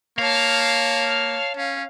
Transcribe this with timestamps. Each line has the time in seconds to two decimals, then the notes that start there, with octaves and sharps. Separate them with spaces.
0.19 A#3 C#5 F5 A5
1.57 C#4 F5